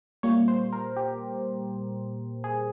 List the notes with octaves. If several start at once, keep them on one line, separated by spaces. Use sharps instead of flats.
A#2 G3 A#3 C#5
C5
A#4
G4
G#4